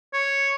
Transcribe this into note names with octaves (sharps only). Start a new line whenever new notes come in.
C#5